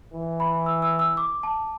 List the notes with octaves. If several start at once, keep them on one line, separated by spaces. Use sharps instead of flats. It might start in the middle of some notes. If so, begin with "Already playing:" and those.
E3
B5
E6
E6
E6
D6
A5